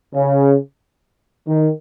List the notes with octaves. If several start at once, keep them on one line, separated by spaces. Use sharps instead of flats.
C#3
D#3